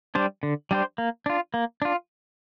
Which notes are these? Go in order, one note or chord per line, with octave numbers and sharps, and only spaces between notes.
G3 D4 G4 C5
D3
G3 D4 G4 C5
A#3
D4 F4
A#3
D4 F4